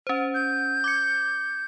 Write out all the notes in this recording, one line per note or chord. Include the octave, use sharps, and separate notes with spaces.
C#4 C5
G6
D6 G#6 C#7